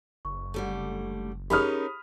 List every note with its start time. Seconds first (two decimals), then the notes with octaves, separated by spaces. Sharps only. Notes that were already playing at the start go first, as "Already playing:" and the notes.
0.25 F#1 C#6
0.54 D3 G3 A3
1.50 C#4 D#4 G4 G#4 A#4 B5 D#6 F6